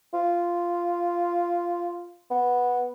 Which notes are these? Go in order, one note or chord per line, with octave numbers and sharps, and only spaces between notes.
F4
B3